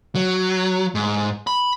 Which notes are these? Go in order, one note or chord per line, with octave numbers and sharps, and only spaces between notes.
F#3
G#2
B5